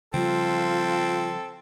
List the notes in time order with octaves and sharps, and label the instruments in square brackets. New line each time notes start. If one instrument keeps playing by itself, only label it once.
[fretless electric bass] C#3 F3 G3 [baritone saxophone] C4 [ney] F4 [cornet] A4